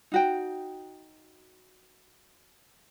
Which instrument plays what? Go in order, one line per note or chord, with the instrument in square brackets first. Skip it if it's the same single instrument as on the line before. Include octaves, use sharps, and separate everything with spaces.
[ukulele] D#4 F#4 G5